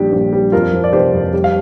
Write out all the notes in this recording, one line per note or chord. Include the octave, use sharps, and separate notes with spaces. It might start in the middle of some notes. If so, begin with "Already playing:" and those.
Already playing: A#1 G3 D4 G4
A#1
G3
F2 F4 A#4
F3
D5
F1 G4 C5
F2
G3
F5